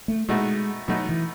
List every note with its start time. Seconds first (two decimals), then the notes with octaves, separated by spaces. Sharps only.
0.08 A3
0.28 B2 G#3 A3 D#4 F#4
0.88 B2 F#3 A3 D#4 F#4
1.09 E3